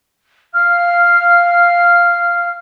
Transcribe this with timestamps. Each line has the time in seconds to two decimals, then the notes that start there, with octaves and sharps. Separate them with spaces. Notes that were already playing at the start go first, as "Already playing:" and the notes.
0.53 F5 F6